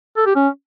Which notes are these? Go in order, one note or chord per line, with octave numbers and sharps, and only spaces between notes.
A4
G4
C#4